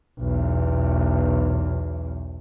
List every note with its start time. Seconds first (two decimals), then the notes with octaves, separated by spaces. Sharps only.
0.19 B1 E2